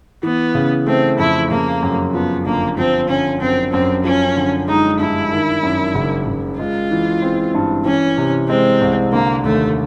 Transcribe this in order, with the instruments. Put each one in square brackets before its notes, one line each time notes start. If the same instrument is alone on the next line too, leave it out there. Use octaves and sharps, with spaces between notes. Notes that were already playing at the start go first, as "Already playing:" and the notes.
[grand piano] E3 [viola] B3
[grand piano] C#3
[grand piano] A3 [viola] C4
[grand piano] F2 [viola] E4
[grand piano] C#3 [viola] A#3
[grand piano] F#2
[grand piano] F3 [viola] B3
[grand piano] G1 [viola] A#3
[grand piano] F3 [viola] C4
[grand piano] D3 [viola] C#4
[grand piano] F#2 [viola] C4
[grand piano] F#2 [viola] C4
[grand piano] F3 [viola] C#4
[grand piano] D3
[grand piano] G#3 [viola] D#4
[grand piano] G2 [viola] E4
[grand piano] D#3
F#2
F#1
F#1
[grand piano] G#3 [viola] F4
[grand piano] E3
C4
G2
[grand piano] E3 [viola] C#4
[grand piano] C3
[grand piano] G#3 [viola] C4
[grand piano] C2
[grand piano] D3 [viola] A#3
[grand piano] D#2 [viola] A3